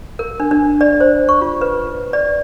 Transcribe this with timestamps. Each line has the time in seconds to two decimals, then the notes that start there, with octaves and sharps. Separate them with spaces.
0.19 A#4
0.40 D4
0.51 D4
0.81 D5
1.00 C5
1.29 C#6
1.41 F4
1.61 B4
2.13 D5